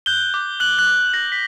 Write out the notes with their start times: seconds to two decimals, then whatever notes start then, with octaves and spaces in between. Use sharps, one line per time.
0.06 F#6 G6 G7
0.34 D6
0.60 F#6 F#7
0.79 F#6 F#7
0.87 D6
1.13 F#6 A#6
1.32 B6